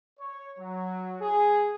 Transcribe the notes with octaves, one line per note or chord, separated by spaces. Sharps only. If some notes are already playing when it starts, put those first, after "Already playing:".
C#5
F#3
G#4